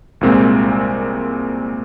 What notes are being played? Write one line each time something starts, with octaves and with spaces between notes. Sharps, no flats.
C2 A#2 G#3 C4